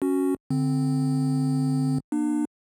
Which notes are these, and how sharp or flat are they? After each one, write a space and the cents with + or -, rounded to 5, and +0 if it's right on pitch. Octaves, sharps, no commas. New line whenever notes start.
C#4 +0 F#4 +0
D3 -5 C4 +0
A#3 +30 D4 +40